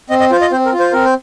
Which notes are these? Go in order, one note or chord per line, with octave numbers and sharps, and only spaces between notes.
C4 D#5
D#5
F4 C5
D#5
C4 C5
A#4
F4
C5
C4 A#4
C5